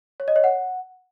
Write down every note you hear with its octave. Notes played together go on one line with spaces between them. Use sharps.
C#5
D#5
C#5
F#5